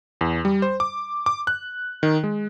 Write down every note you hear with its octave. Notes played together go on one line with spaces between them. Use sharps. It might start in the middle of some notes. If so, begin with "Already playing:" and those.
E2
G3
C5
D6
D6
F#6
D#3
G#3